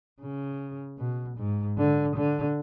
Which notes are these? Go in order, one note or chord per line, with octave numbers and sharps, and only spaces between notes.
C#3
B2
G#2
D3
D3